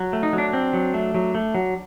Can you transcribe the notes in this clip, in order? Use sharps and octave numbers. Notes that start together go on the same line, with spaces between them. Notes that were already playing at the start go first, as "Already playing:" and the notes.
Already playing: F#3
A3
D#4
F#3
D4
C4
F#3
A3
F#3
A3
F#3